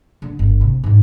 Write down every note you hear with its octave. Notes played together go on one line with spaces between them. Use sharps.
D3
G1
C3
G#2 E3